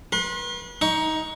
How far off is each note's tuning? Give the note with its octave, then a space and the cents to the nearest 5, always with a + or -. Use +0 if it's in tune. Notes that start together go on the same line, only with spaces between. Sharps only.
B4 -35 C6 +35
D#4 +15 C#6 +15